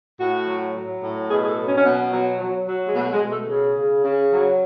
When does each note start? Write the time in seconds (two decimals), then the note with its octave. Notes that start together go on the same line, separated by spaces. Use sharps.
0.19 A2 F#4
0.47 F#3
0.75 F#3
1.03 A2
1.29 B2 G#4
1.43 G#4
1.48 A4
1.57 F#3
1.66 C#4
1.78 C#4
1.84 B2 B3
2.12 F#3
2.39 F#3
2.67 F#3
2.87 G#3
2.94 B2 A3
3.13 G#3
3.22 B2
3.31 A3
3.49 C#3 G#4
3.76 C#3
4.04 C#3
4.32 F#3